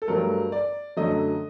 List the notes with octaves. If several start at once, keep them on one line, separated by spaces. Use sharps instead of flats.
A4
G2 F#3 A3 A#4
D5
F#2 D3 F#3 A3 D#5